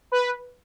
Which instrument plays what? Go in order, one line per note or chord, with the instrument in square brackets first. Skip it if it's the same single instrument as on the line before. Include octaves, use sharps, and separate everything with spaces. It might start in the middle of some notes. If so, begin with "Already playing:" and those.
[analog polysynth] B4